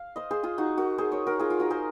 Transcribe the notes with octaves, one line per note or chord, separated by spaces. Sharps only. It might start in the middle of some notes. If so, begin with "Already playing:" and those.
Already playing: F5
C5 D#5
G#4 C5
F4 G#4
D#4 F#4
F#4 A#4
G#4 C5
A#4 C#5
F#4 A#4
F4 G#4
F4
F#4 A#4
G#4 C5